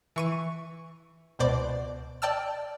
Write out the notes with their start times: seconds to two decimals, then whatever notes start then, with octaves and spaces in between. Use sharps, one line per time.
0.16 E3 C#6 D#7
1.39 C#2 B2 C5 D5
2.22 D5 G5 A5 E6 F6